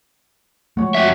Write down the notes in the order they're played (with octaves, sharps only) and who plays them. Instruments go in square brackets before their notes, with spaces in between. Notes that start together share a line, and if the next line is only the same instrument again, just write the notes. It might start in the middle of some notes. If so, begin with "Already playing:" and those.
[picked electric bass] F3 G#3 A3 [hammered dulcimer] C#5 F#5
[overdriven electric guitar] F2 E5 [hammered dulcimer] F#4 G4